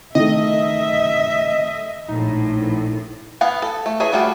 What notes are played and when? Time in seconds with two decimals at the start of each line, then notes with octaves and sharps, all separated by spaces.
0.15 D#3 A3 D#5 E5
2.08 A#1 A2 D#4
3.41 B3 F5 F#5 G#5
3.62 A4
3.86 A3
4.00 E3 G#4 C#5 E5
4.13 G3 A3 F4 F#4 G#4